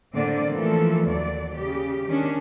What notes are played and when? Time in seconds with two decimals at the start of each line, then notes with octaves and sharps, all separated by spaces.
0.14 A2 D3 A#3 C4 D5
0.51 E3 F3 A3 A#3 A4
1.06 D#2 F#3 D5
1.56 C#3 G4
2.08 D#3 C#4 D4